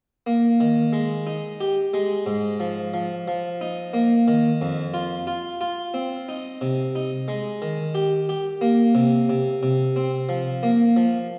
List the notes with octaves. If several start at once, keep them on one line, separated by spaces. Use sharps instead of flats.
A#3
D#3
G#3
D#4
G4
G#3
G#2
F3
F3
F3
D#4
A#3
D#3
F2
F4
F4
F4
C4
D#4
C3
D#4
G#3
D#3
G4
G4
A#3
C3
C3
C3
C4
F3
A#3
F3